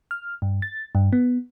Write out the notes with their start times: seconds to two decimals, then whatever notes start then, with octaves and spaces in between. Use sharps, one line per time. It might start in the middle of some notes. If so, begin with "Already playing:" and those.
0.11 F6
0.42 G2
0.62 A6
0.95 G2
1.13 B3